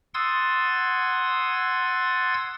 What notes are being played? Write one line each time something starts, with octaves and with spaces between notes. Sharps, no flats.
F#5 C6 D#6 E6 G#6 A6